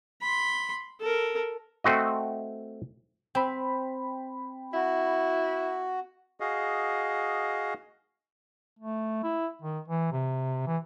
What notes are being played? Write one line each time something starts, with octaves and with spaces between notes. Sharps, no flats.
B5 C6
A4 A#4
A3 C4 F#4 D#5
C4 G5 B5
E4 F#4
F#4 G#4 D#5 F5
A3
E4
D#3
E3
C3
E3